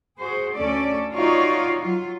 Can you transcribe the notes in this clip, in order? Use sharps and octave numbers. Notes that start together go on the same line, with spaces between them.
F#4 G#4 C5
D2 C#4 A4 D5
D#4 F4 F#4 C#5 D5 F5
F#3 F4